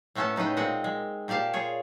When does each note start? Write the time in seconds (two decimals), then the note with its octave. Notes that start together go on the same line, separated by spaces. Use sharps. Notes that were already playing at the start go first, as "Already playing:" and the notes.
0.15 A2 A3 B3 C#4 A4 A5
0.36 C#3 D#4 B4 D#5 G5
0.57 A#2 G#3 C4 D#5 F#5
0.84 G#3
1.28 A#2 G4 D5 F5 A5
1.53 F4 G#4 C#5